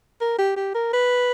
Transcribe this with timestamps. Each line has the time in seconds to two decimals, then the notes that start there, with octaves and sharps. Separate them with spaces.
0.21 A#4
0.39 G4
0.56 G4
0.74 A#4
0.93 B4